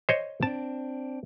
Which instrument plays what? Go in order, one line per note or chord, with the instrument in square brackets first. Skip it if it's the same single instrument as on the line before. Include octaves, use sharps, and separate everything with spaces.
[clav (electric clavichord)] C5 C#5 D#5
[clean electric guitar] C4 D4 [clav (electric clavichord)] A5